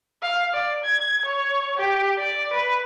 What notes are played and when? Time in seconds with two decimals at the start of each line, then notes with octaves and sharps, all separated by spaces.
0.22 F5
0.54 D5
0.84 G#6
1.26 C#5
1.78 G4
2.18 D5
2.53 B4